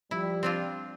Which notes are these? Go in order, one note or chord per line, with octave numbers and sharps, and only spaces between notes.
F3 G3 E4
C4 D4 F4